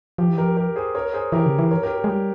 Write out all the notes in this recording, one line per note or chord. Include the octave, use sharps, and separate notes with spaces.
F3 G4
E3
F3 G4 A#4
G4 A#4
G#4 C5
A#4 C#5
G#4 C5
E3 G4 A#4
C#3
E3
A#4 C#5
G4 A#4
G4
G#3
G3 G4